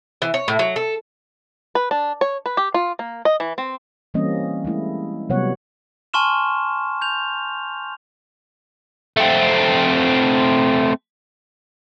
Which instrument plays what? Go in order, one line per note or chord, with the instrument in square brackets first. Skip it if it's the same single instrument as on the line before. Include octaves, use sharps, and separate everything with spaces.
[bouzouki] E3
C#5
A2
F#3
A4
[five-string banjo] B4
D4
C#5
B4
G4
F4
A#3
D#5
E3
C4
[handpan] E3 G3 A#3 C4 C#4 D#5
G#3 A3 E4
C3 F#3 G3 B3 C#5 F#5
[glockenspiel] G#5 A5 C6 C#6 F6 E7
G6 F7
[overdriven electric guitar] A3 C4